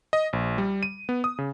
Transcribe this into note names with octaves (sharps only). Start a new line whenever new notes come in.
D#5
A#1
G3
D#7
B3
D#6
C#3